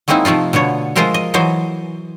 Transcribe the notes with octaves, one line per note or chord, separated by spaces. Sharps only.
F#3 G#3 A#3 C4 D#4 E4
C3 F3 A3 D#4 F4
B2 D3 B3 C#5
F3 G#3 F4 A#4 C5 E5
D#5
E3 F#3 C5 D#5 G#5